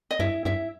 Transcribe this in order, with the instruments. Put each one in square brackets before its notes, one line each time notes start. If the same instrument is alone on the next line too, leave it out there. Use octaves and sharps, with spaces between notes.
[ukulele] D#5
[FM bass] G2 [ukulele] E4 E5
[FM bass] G2 [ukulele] E4 E5